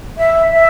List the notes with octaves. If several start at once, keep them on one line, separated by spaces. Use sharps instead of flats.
E5
E5